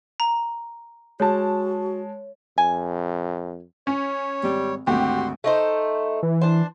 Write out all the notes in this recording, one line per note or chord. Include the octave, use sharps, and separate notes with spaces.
A#5
G#3 F#4 C#5 A5
F2 G#5
C#4 C#5
G#1 G3
G#1 D2 F#4 G4 C6
A3 D#4 C5
E3
D4 C5